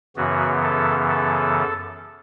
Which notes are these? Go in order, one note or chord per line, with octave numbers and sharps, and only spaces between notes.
F#2 C#3 E3 B3 F#4
A4
A4